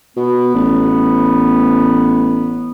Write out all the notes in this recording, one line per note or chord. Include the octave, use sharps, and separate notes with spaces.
B2 B3
A1